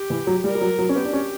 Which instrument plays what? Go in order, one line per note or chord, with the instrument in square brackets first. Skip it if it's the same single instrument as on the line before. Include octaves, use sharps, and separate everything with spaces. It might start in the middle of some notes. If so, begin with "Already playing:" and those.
Already playing: [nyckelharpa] G4
[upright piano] E3
F#3
[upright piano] G3 [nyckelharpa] A#4
[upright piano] G3
F#3
F#3
C#4
[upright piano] B3 [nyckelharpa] G4
[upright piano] D4
C#4